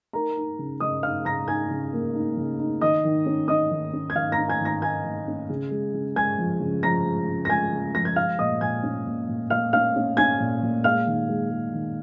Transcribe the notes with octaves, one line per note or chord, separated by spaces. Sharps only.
D#4 A#4 A#5
D#4
C#3
C#3 D#5 D#6
D#4 F5 F6
C#3 A#5 A#6
D#4 G#5 G#6
C#3
A#3
D#4
C#3
D#4
D#3 D#5 D#6
D#3
C#4
C#4 D#5 D#6
D#3
C#4
G#6
D#3 F5 F6
A#5 A#6
C#4
G#5 G#6
D#3
A#5 A#6
D#3 G#5 G#6
D#3
C#4
C#3
G#3
C#3
G#3 G#5 G#6
F3
C#3
F3 A#5 A#6
G#3
C#3
A#6
G#3 G#5 G#6
C#3
F3 A#6
G#6
G#3 F5 F6
A#2 D#5 D#6
A#2 G#5 G#6
C#4
A#2
A#2
A#2 F5 F6
C#4 F5 F6
C#4
C#4 G#5 G#6
A#2
A#2
G#3 F5 F6
D#3
G#3
G#3
D#3